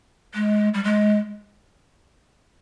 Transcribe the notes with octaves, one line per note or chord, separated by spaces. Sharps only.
G#3
G3
G#3